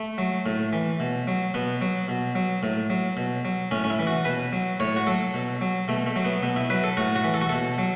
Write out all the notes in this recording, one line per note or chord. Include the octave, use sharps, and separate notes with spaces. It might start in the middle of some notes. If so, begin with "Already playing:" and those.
Already playing: A3
F#3
A2
E3
B2
F#3
B2 B3
F#3
B2
F#3
A2
F#3
B2
F#3
A2 C#4
C#4
E4
E3
F#4
B2 B4
F#3
A2 C#5
F#4
F#3 A4
B2
F#3
B2 A3
A3
F#3
B3
B2 B3
E4
F#3 B4
A4
A2 F#4
F#4
E3
A4
F#4
B2 A4
F#3